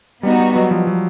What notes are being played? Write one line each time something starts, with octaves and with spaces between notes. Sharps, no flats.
G3 B3 D#4 F#4
G3
F#3
F3
F#3